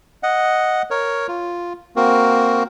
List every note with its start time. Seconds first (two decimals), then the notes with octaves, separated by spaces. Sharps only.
0.23 D#5 F#5
0.91 A#4 C#5
1.28 F4
1.96 A#3 C4 F#4 A#4